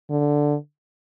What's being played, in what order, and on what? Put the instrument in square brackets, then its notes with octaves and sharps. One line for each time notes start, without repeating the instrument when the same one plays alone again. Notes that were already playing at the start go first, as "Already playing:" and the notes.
[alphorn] D3